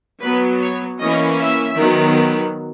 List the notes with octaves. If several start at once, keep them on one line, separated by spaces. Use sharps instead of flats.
F#3 B3 B4
C#5
E3 A#3 C#4 D#5
E5
D#3 F#3 B3